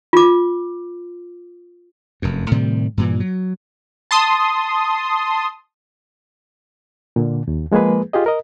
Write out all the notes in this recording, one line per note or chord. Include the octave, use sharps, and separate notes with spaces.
F4 D6
F1 F#2
A2 C3 D#3 G3
G2 A#2 E3
F#3
A5 C6 D#6
A#2 D3
D#2
F3 G#3 A#3 G#4 B4
F4 G4 G#4 D#5
A#4 D#5